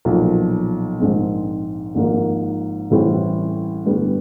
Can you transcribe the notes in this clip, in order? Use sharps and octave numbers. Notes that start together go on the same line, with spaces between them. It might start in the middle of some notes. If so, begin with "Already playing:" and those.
B1 A#2 F3
A#1 G#2 D#3 G#3 C4
G#1 G#2 F3 A#3
A1 A2 E3 G3 C4
G2 D3 G3 B3 D4